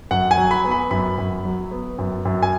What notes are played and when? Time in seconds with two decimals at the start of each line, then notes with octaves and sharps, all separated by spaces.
0.11 F#2 F#5
0.31 G#5
0.37 F#3
0.51 B5
0.64 B3
0.71 B5
0.91 F#2 B5
1.18 F#2
1.45 F#3
1.71 B3
1.98 F#2
2.25 F#2
2.43 G#5